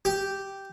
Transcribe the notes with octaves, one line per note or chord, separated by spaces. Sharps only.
G4